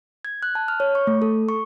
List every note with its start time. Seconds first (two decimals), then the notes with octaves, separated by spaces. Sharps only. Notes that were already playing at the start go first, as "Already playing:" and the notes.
0.25 G#6
0.43 F#6
0.55 A5
0.68 F6
0.80 C#5
0.95 C#6
1.07 A3
1.22 A4
1.49 C#6